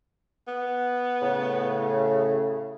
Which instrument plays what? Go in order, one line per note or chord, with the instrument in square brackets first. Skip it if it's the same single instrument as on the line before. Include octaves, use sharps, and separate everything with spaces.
[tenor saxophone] B3
[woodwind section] A2 C#3